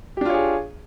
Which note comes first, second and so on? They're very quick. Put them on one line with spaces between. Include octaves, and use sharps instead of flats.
G4 D4 F4 C#5 G#4